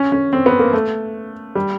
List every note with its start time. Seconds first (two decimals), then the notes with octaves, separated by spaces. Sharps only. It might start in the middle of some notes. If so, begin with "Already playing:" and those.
Already playing: C#4
0.12 C#4
0.33 C4
0.46 B3
0.59 A#3
0.73 A3
1.55 G3